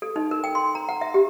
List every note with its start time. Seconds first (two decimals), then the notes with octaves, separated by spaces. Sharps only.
0.02 A4
0.16 D#4
0.31 A#4
0.44 G5
0.55 C6
0.75 A#5
0.89 F#5
1.01 E5
1.14 G4